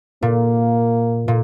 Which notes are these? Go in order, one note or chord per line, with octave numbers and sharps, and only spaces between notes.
A#2 A#3
A#2